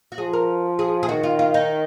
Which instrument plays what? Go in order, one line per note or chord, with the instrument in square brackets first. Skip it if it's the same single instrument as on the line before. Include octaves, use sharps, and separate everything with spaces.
[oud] F#4
[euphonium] F3 [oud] G#4
[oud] A#4
G#4
G#4
[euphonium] D#3 [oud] F#4
[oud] F4
F4
D#4